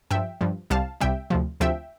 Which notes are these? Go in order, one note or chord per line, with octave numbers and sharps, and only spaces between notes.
G2 F3 E5 G5
G2 F3
C2 C3 G3 F5 A5
C2 C3 G3 E5 G5
D2 C3 F3
D2 C3 F3 E5 G5